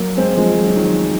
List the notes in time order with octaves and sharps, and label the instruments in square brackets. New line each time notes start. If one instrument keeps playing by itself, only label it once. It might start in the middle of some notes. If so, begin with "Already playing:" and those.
Already playing: [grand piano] F#3 A#3
G#3 C4
F3 G#3
F#3
F3
D#3 F#3